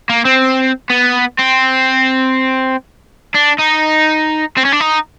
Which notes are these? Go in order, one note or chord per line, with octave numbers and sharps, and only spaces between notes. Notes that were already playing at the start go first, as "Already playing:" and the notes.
A#3
C4
B3
C4
D4
D#4
C4
C#4
D4
D#4